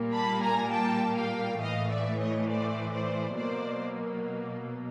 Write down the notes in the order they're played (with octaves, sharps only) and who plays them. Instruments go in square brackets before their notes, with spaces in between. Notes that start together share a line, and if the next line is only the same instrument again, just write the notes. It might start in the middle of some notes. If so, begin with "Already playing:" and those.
Already playing: [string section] A#2 G3 A#3
A5 B5
G#5 A#5
G5 A5
F5 G5
A2 E3 A3 D#5 F5
D5 E5
C#5 D#5
C5 D5
C5 D5
B2 F#3 A#3 C5 D5